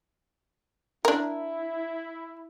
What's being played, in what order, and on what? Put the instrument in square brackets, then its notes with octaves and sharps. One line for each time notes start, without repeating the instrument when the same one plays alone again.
[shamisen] D4 A#4 [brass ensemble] E4